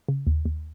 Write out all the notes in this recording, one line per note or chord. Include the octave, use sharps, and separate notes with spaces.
C#3
D#2
D#2